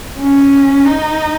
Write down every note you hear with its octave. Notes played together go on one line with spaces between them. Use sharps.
C#4
D#4